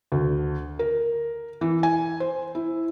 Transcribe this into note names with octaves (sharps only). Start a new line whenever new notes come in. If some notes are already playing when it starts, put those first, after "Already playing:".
D2
A#4
E3
G#5
C5
E4